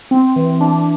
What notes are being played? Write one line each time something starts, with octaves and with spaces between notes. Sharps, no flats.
C4
E3
D4